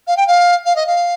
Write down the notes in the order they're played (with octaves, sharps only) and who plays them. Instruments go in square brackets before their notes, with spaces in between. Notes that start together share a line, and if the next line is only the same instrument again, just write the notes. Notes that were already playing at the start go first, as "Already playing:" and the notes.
[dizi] F5
G5
F5
F5
D#5
F5